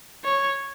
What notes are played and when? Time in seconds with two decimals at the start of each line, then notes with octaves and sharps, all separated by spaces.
0.25 C#5